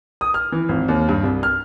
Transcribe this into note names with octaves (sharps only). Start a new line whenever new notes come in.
D#6
F6
E3
G#1
D#2
G2
C2
F6